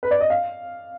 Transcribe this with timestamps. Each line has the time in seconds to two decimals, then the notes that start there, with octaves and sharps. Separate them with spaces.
0.03 B4
0.11 D5
0.21 D#5
0.30 F5